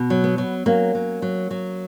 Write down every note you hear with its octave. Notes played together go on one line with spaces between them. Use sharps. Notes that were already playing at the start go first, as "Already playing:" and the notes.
Already playing: B2
F#3
B3
F#3
F#3 A#3 C#4
F#3
F#3
F#3